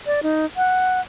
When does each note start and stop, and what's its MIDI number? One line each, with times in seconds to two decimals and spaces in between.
0.06 0.20 74
0.23 0.45 63
0.57 1.01 78